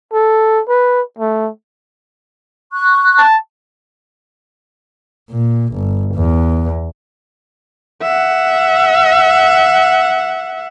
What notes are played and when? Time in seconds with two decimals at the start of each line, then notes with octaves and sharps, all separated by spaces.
0.13 A4
0.69 B4
1.19 A3
2.73 C#6 F#6
3.18 A5
5.30 A#2
5.73 G1
6.15 E2
8.02 E5 F#5